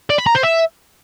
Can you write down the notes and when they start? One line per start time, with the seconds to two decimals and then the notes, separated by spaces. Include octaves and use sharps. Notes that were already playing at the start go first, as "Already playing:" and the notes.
0.10 D5
0.18 B5
0.26 A#5
0.35 C5
0.43 E5